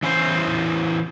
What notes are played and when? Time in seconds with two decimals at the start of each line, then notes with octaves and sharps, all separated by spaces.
0.03 E3 C#4 E4 C5